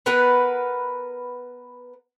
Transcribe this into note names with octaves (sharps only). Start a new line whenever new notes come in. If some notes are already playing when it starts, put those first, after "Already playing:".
B3 A#4 B4 F#5